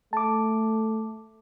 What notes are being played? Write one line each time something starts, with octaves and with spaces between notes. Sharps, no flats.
A3 A5 D6